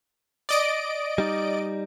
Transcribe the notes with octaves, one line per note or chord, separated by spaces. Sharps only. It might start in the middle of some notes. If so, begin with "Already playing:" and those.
D5 D#5 D7
G3 D#4